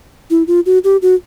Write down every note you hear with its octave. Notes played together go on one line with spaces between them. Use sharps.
E4
F4
F#4
G4
F#4